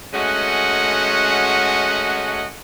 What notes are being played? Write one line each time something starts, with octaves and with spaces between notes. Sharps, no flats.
G#3 A3 C#4 F#4 D#5 F#5